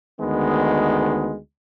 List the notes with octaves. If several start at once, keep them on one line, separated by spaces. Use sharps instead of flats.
D2 D#3 G#3 B3